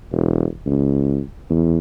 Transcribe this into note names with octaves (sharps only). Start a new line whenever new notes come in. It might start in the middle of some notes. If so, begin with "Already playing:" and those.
E1
C#2
E2